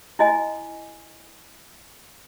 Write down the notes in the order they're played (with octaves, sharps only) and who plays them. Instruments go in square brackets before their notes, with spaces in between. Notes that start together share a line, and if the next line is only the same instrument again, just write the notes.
[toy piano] E4 F#4 D#5 G#5